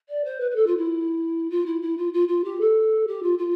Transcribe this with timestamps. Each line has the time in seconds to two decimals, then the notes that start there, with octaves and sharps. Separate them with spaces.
0.09 D5
0.24 C5
0.40 B4
0.51 B4
0.55 A4
0.67 F4
0.77 E4
1.50 F4
1.66 E4
1.82 E4
1.97 F4
2.13 F4
2.28 F4
2.44 G4
2.60 A4
3.07 G4
3.22 F4
3.38 F4